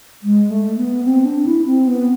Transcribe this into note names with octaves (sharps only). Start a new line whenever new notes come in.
G#3
A3
B3
C4
D4
E4
C4
B3